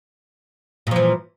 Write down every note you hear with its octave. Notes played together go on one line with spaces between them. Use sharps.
A#2 E3 F3